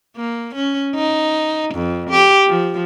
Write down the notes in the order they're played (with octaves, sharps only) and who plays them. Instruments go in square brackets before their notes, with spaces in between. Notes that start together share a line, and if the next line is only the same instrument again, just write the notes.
[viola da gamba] A#3
C#4
D#4
F2
G4
F3